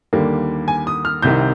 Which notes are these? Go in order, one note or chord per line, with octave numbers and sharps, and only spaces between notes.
D#2 D3 G3 A#3
G#5
D#6
F6
C2 C3 D#3 G6